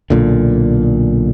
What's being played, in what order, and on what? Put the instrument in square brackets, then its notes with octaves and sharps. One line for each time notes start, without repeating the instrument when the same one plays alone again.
[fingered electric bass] B1 A#2 D3